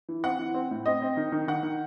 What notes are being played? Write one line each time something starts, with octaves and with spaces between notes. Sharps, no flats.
E3
C4 F#5
E3
C4
A2
C4 D#5
C4
D#3
D#3
D#3 F#5
D#3